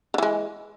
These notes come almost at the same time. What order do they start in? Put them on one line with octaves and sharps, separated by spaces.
D3 E3 G#3